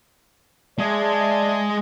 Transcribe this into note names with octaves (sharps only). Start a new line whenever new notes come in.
G#3 G#4 D5 E5 A5